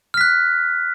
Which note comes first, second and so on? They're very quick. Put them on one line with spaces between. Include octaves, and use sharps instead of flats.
F6 B6 F#6